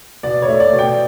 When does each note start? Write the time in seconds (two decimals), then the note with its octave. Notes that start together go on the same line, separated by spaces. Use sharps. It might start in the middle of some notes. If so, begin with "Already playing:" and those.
0.23 B2 D5
0.42 C#5
0.48 A3
0.60 D5
0.72 B2
0.79 G5